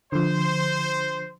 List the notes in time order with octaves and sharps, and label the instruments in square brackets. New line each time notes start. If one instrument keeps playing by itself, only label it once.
[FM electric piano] D3 F3 [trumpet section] C5